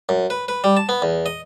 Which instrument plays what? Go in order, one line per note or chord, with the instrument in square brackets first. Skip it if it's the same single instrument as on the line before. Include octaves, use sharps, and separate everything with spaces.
[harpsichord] F#2
B4
B4
G3
A5
B3
E2
D#5